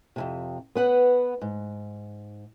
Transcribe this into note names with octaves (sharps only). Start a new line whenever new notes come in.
F2 A2 C3
B3 B4 F#5
G#2